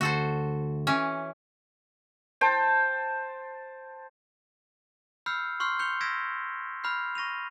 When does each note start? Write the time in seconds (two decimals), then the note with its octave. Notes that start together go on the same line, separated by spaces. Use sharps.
0.01 D2 F#4 A4 C5
0.87 E3 C#4
2.41 C5 G5 A5
5.26 B5 E6 F6 G6 C7 C#7
5.60 C6 C#6 F6 G6 C7
5.79 G6 C#7 F7 G7
6.01 E6 G#6 A#6 B6 D7 E7
6.84 B5 F6 G6 C7
7.15 C#6 A#6 D#7 F7